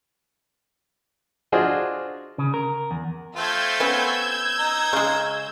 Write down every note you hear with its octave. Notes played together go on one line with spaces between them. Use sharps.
D4 F4 F#4 G#4 C5 D#5
C#3
A#4
E2
A3 C4 F4 E6 G6 G#6
B3 C#4
D#4 A#5
C#3 G#3